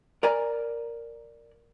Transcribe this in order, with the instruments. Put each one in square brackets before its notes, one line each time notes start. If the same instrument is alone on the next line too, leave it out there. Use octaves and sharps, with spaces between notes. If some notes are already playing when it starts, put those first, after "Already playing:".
[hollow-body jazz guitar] A#4 D5 G#5 A#5